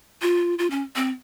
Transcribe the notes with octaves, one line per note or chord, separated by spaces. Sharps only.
F4
F4
C#4
C4